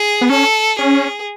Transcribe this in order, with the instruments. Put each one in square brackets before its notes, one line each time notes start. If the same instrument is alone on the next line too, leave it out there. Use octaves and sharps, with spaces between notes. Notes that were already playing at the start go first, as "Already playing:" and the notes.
Already playing: [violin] G#4
[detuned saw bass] B3
[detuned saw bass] C#4 [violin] A4
[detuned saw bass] C#4 [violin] G#4